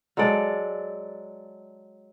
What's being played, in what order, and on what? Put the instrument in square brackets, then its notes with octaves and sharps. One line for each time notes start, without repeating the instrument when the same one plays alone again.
[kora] F#3 G#3 A4 D5